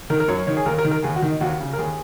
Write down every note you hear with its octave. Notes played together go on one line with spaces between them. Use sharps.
D#3 A#4
A#4
F#2 C#5
D#3 C#5
G#4
D#2 A#4
A#4
D#3
A#4
D#2 G#4
F#4
D#3
D#4
D#2 F#4
C#3
A#4
D#2 G#4